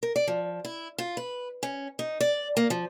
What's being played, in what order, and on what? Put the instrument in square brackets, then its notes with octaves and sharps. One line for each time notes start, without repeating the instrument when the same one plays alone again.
[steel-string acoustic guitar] A#4
D5
F3
E4
F4
B4
C#4
D#4
D5
A#3
F3